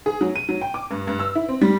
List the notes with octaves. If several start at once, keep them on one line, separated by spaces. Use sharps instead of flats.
G#4
F#3
D#7
F#3
G5
D6
G2
G2
E6
E4
C4
G3